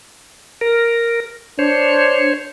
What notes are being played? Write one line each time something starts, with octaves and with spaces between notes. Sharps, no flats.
A#4
D4 C5 C#5